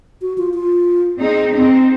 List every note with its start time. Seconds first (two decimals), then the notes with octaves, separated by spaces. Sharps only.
0.22 F#4
0.38 F4
0.54 F4
1.21 C4 D#4 G#4
1.55 C4 D#4